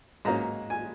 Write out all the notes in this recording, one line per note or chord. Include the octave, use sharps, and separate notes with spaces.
G#2 F#3 A#3 C#4 A#5
G#5